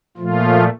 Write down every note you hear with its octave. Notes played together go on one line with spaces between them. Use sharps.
A#2 F3 A3 F4